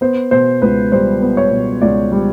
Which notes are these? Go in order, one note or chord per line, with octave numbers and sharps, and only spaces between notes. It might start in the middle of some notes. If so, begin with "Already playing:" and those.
B3 C5
B2 C5
C#2 B4
G3 C5
B3
C#5
B2
C#2 D5
G3